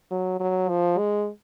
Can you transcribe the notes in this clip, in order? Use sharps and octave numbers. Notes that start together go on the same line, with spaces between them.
F#3
F#3
F3
G#3